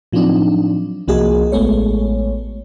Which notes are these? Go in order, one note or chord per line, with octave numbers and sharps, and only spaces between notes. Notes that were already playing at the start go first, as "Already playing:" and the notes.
A2 F3 F#3 C4 D4 D#4
C2 F3 A#3 F#4 G#4 D#5
A1 G#3 A3 B3 C#5